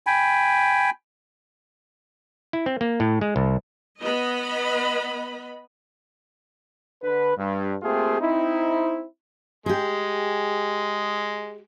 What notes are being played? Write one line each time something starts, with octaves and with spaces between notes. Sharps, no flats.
G5 G#5 B5
E4
C4
A#3
A2
G#3
C2
B3 D#5 B5
D3 B4
G2
A3 A#3 C4 F4 G4 G#4
C4 D#4 E4
G#3 G4 G#4